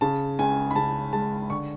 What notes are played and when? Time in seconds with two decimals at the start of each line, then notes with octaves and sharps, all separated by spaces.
0.01 C#3 A5
0.39 C#2 G#5
0.71 B5
0.76 C#3 A5
1.13 G#3 A5
1.50 D3 C#6